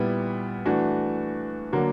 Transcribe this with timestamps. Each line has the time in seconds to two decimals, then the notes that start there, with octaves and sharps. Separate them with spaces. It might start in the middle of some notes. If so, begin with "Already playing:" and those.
Already playing: A#2 G3 B3 E4
0.65 E3 A3 D4 F#4
1.72 D3 F#3 A#3